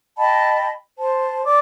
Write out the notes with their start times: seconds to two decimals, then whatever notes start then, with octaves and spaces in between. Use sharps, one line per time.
0.18 D#5 G5 A5 B5
0.98 C5 A5
1.44 D5 D6